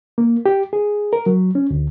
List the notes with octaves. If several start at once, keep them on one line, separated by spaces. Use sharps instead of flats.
A#3
G4
G#4
A#4
F#3
C#4
D2